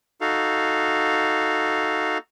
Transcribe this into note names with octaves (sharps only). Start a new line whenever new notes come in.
D#4 F#4 A4 F5